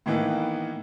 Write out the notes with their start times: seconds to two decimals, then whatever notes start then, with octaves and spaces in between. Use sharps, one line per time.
0.06 A2 D#3 E3 A#3 B3